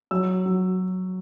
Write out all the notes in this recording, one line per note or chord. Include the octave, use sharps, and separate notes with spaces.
F#3 E6
F#3